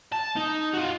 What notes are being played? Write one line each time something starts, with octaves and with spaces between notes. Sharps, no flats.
A5
D#4
F4 F#4